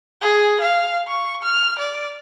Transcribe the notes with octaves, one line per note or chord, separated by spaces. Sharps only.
G#4
F5
C#6
F6
D5